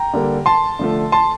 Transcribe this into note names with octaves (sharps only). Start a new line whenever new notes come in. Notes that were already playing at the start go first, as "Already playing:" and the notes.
Already playing: G5 A#5
D3 G3 A#3
A5 C6
D3 F3 A3
A5 C6